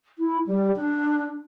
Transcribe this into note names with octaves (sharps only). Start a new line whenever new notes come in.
E4
G3
D4